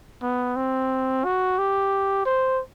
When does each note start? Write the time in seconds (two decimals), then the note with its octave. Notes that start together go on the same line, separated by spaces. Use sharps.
0.23 B3
0.56 C4
1.25 F#4
1.59 G4
2.26 C5